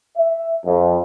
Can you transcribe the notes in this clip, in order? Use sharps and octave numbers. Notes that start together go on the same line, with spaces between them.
E5
F2